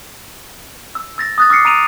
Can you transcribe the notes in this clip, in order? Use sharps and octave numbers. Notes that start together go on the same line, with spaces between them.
E6
E6 A6 A#6
D#6 F#6 A6
D6 E6 F6 A#6 C7 C#7
A#5 D7 D#7 F7